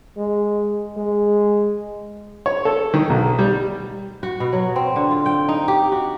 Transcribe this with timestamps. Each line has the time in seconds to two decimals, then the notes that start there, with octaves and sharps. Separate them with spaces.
0.17 G#3
0.97 G#3
2.46 C#5
2.65 A4
2.94 D#3
3.10 B1
3.39 G3
4.23 F#4
4.40 B2
4.53 F#3
4.76 C4
4.96 D3
5.11 F4
5.26 G5
5.49 D#4
5.68 G4
5.92 F#4